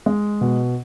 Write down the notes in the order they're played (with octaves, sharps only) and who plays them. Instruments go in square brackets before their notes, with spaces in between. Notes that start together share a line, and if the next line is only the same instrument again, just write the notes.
[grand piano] G#3
B2